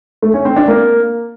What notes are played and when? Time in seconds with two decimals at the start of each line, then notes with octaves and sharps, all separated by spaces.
0.22 A3
0.34 C#4
0.45 C4
0.56 D4
0.68 A#3